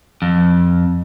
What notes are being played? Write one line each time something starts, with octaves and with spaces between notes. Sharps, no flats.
F2